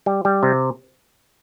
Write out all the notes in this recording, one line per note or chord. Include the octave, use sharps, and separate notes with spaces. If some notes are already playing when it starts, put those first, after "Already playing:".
G3
G3
C3